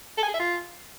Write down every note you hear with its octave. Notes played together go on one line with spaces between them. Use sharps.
A4
G#5
G#4
E5
F4